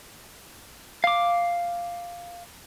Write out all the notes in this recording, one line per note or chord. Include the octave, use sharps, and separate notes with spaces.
F5 D6